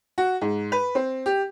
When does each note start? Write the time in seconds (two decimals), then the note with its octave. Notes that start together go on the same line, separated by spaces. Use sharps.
0.18 F#4
0.41 G#2
0.72 B4
0.95 C4
1.26 G4